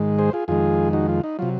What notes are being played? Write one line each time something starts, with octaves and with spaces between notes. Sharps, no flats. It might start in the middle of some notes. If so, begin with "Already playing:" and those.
Already playing: G#2 D#3 G#3
G#4 C5
F4 G#4
F2 D#3 G#3 F4 G#4
D#4 F#4
F4
D#4
C3 F#3 F4